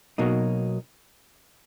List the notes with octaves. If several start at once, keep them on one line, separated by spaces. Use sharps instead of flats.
B2 F#3 A#3 D#4